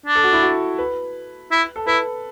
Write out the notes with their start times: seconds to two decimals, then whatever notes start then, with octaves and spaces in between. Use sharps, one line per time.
0.06 D4
0.15 A4
0.24 F#4
0.33 E4
0.43 F#4
0.78 B4
1.51 E4
1.76 A4
1.87 E4 B4